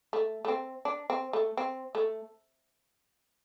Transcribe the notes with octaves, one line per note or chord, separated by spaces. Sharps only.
A3
A3
C4
D4
C4
A3
C4
A3